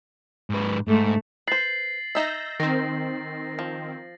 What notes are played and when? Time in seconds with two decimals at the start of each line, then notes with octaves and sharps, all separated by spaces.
0.50 G#2 B4
0.88 G#2 A3
1.47 B4 C5 A6 C7 F#7
2.15 D#4 E5 E6 G6 A#6
2.60 D#3 C4 A#6
3.59 F3